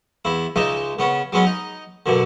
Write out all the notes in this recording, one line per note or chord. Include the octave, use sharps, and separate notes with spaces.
E2 E4
C#2 G#3 D#4 E5
C#3 B3 C#4
F#3 G#3 B3 C#4
D#4
F#2 B2 D3